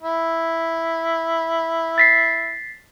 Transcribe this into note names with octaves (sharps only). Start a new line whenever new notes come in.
E4
A6 B6 C7